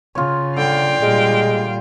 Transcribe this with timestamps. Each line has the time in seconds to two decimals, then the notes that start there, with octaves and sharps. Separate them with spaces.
0.15 C#3 F4 C#5
0.56 D3 F5 G5
1.02 A#2 G3 G#3